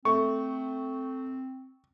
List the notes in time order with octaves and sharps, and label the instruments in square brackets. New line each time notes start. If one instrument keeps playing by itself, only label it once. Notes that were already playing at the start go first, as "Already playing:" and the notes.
[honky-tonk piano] A3 [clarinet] C4 [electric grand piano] C#6